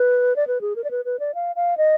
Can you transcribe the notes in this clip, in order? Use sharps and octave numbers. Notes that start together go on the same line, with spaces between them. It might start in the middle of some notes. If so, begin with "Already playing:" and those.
Already playing: B4
D5
B4
G#4
A#4
D5
B4
B4
D5
F5
F5
D#5